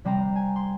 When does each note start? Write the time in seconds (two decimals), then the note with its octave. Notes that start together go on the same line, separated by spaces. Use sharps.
0.05 C3 G3 C4 A#5
0.36 G#5
0.56 C6